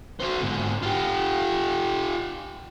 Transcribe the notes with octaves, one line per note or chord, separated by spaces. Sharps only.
F#4 C5
G#2 D3
F4 G4